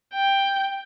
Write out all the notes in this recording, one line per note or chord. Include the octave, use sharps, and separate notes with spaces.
G5